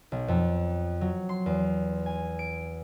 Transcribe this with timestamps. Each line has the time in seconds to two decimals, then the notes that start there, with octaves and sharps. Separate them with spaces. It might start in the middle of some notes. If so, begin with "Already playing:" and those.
0.12 B1
0.28 F2
1.01 F#3
1.29 C6
1.46 E2
2.06 G#5
2.39 D7